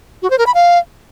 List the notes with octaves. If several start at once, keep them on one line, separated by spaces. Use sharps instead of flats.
F#4
C5
A#4
B5
F5